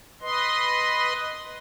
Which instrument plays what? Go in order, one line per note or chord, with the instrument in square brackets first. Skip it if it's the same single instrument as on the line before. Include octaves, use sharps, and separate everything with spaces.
[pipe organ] B4 D#5 C6